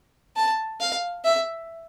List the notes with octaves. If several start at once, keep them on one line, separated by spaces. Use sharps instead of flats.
A5
F5
E5